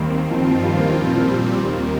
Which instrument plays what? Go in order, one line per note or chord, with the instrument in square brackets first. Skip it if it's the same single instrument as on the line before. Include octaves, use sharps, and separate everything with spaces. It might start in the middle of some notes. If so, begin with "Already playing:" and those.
Already playing: [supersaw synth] D#2 D#3 C4 [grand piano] G3 A#3
[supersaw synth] G2 D#3 C4 F4 [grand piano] F3
[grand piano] F3
G3
A#3
[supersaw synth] A#2 G3 C4 [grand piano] F3
[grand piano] F3
G3
[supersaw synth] D#2 D#3 A#3